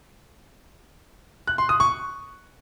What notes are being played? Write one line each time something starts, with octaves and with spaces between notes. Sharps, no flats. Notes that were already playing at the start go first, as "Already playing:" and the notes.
F#6
C6
D#6
C#6